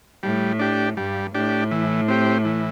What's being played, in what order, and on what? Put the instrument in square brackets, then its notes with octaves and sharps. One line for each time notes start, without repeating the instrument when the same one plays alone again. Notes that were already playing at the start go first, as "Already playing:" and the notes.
[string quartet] A2 [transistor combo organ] G3
[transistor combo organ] D4 G4
[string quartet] G2 [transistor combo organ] G3
[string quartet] A2 [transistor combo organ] D4 G4
[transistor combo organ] E3
C4 G4
E3